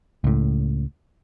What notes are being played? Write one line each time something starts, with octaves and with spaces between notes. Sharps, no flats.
C#2 A2